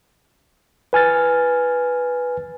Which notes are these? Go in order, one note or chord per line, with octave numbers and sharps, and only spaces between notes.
B4 G#5 F6 A6